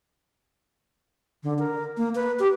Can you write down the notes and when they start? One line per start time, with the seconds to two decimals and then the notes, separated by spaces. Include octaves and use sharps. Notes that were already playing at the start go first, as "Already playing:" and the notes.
1.43 D3
1.59 A#4
1.97 A#3
2.15 B4
2.39 G4